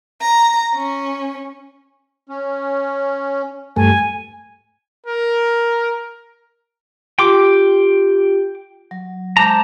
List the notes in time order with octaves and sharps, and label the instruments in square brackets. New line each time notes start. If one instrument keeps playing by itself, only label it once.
[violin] A#5
C#4
[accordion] C#4
[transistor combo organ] G2 A3 [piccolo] G#5
[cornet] A#4
[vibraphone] F4 G4 [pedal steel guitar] G5 C6 D6
[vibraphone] F#3
[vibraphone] G#3 D6 [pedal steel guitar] C5 A5 A#5